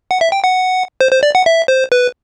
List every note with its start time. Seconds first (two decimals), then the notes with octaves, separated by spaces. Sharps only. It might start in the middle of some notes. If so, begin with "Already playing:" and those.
0.11 F#5
0.21 E5
0.32 G5
0.44 F#5
1.01 C5
1.12 C5
1.23 D5
1.35 F#5
1.46 E5
1.68 C5
1.92 B4